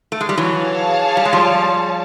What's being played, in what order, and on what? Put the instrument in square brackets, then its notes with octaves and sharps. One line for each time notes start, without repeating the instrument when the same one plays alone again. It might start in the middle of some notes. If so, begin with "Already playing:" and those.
[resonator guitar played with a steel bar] A3
G#3
G3
[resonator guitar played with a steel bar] E3 F#3 [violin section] G#4 C#5 F5 A5
[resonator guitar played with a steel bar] G3
G#3
F3 G3